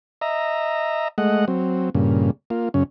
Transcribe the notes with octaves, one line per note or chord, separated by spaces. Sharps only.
D#5 E5 A#5
G#3 A3 D#5 F#5
F#3 C4
G2 A#2 C#3
A#3 F4
F#2 C#3 C#4